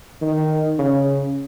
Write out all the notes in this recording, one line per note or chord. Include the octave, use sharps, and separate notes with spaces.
D#3
C#3